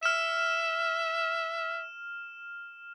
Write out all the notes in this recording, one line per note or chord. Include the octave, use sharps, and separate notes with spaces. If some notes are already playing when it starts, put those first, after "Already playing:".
E5 F6 E7